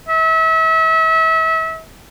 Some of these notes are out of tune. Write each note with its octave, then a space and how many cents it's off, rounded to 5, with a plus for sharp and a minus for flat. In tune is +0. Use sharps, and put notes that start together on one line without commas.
E5 -35